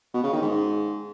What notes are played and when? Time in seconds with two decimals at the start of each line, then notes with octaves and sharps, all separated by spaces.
0.14 B2
0.24 C#3
0.33 D#3
0.42 G#2